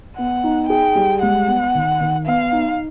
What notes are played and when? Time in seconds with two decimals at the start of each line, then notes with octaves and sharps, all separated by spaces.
0.17 B3 F#5
0.44 D#4
0.70 G#4 G5
0.95 G3
1.22 G#3 F#5
1.47 B3
1.75 D#3
2.01 D#3
2.26 B3 F5
2.52 D#4